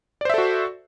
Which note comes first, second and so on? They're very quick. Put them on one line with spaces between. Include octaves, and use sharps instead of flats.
D5 C5 E5 A4 F#4